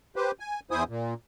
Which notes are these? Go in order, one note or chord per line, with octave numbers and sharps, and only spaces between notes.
G4 B4 C5
G#5
E2 E4 C5 G#5 D#6
A#2